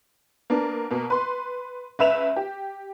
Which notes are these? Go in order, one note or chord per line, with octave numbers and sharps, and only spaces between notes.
A#3 B3 D4
B2 A#3
B4 C6
C#2 B4 E5 E7 F7
G4